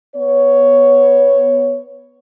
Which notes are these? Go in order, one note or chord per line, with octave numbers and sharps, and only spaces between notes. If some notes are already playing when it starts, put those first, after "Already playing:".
B3 C#5